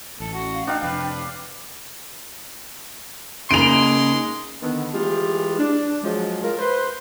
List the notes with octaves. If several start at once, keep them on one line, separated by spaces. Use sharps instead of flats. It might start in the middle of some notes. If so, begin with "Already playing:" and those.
A1 A4
F#4
F5
D4 D#4 F5 G5
F2 C3 B4
C#3 G#3 A#3 D#4 C6 D7 F7
D3 D#3 B3
E3 G#3 A3 F4 G4
D4
F3 F#3 G#3
G#3 F4 A#4
B4 C5